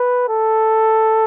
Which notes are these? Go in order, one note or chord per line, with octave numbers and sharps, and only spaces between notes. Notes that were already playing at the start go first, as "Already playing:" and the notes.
Already playing: B4
A4